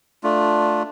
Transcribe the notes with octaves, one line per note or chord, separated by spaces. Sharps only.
A3 D4 F4